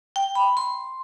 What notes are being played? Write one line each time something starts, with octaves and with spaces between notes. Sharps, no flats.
G5
B5
C6